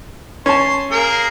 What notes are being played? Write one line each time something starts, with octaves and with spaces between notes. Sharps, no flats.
C#4 A5 C6
A#3 G#4 A#4